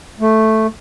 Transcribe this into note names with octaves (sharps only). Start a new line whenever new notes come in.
A3